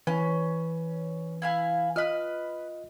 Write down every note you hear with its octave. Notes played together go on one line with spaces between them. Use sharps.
E3 C#4 B4
E4 F5 G#5
F4 B4 D#5 F6